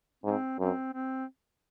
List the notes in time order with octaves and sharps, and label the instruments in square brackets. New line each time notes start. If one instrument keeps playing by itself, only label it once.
[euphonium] G#2 [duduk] C4
[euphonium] F#2 [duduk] C4
[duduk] C4